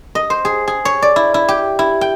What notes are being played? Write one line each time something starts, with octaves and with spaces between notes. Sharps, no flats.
D#5
C5
G#4
G#4
C#5
D5
E4
E4
G4
E4
G5